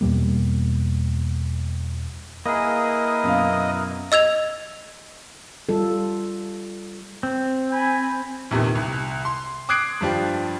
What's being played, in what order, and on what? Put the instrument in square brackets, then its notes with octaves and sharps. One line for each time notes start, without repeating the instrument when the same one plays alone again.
[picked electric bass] E2 B2 G3 A#3
[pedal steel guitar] A#3 G#4 [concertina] E4 A#4 B4 [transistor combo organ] D#5
[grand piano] F#2 B2 F5
[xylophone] D#5 E6 G#6 F7
[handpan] G3 F4 A4
[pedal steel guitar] C4
[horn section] G#5 B5
[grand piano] A#1 E2 C3 D#3
C2
C6
D6 D#6 F#6 G#6 C7 D7
G2 F3 D4 G4